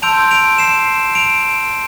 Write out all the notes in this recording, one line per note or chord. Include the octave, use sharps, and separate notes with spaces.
A5 C6 E6 G6 D7 F7
D7 F7
C7 E7
D7 F7